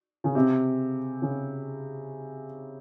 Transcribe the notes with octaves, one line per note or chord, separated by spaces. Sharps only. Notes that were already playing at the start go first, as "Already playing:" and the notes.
C#3
C3
C#3